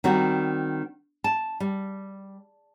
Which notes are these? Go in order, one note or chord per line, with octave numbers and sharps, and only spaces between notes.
D#3 G3 C4 F#4
A5
G3